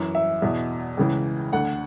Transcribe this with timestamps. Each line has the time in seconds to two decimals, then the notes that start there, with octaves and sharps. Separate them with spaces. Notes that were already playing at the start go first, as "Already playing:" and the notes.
Already playing: F#2 E3
0.15 E5
0.42 E2 B2
0.97 C#2 C#3 E3
1.52 D2 D3 F#5